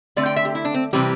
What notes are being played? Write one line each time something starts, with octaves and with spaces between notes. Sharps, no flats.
D3 A3 C4 D5
G5
E5
G4
E4
D4
C4
C3 E3 G3 C4 G4